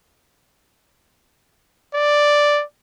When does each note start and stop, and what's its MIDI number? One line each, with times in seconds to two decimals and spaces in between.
1.95 2.63 74